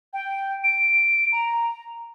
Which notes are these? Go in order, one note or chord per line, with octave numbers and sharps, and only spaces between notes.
G5
D7
A#5